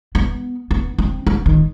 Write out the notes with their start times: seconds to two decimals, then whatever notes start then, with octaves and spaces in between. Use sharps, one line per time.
0.15 B3
0.71 B3
0.98 C4
1.27 B3
1.46 D#3